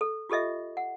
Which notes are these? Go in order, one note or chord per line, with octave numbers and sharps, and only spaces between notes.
A4
F4 G4 A4 D#5 E5
F#5